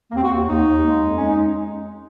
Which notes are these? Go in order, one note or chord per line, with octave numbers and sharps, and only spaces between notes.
A#3
D#2 C4
F#4
D#2
D#2 D#4
D#2
G#3
F2
G#3 C#4
D#4